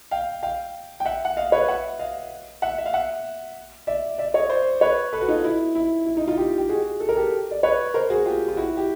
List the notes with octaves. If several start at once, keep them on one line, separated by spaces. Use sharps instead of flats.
F5 G5
F5 G5
G5
E5 F#5
F#5
D#5 F5
B4 C#5
E5 F#5
D#5 F5
E5 F#5
E5
F5
E5 F#5
D5 E5
D5 E5
C#5 D#5
C5 D5
B4 C#5
A4 B4
F#4
D#4 F4
E4
E4
E4
D#4
D#4 F4
F4 G4
G4
F#4 G#4
A4
A#4
G4 A4
D5
B4 C#5
A#4 C5
F#4 G#4
F4 G4
F4
E4 F#4
G4